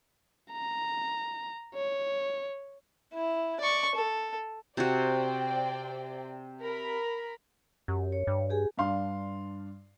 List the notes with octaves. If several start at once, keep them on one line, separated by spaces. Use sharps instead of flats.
A#5
C#5
E4
D5 C#6
A4
C3 F#4 C5 D5 G5
A#4 B5
F#2 G4
C#5
G2
G4 G#4 G#5
G2 D4 F5 C6